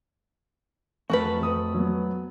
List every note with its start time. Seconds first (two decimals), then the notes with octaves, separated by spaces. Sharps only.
1.10 F2 A3 F#4 A#4 B4 A5
1.40 F2 D#6
1.75 F#3 B3